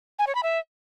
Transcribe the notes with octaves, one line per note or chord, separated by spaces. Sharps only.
G#5
C#5
B5
E5